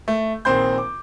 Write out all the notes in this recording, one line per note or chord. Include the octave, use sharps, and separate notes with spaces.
A3
A#1 D#3 C4 C5 C6 G6
D6